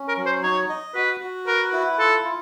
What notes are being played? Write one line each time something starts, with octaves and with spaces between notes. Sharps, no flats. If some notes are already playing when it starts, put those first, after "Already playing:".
Already playing: C#4
A#4
F#3
C5
D#4 C#5
D#5
F#4 B4
F#4
A#4 B4
E4
F4 A4
F4